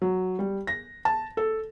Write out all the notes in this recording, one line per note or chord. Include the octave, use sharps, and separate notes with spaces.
F#3
G3
A#6
A5
A4